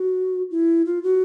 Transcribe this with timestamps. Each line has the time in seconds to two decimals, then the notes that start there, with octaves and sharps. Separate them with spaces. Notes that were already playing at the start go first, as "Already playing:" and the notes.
Already playing: F#4
0.51 E4
0.86 F4
1.03 F#4